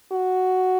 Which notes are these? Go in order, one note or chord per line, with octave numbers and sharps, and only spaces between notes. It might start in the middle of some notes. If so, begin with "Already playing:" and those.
F#4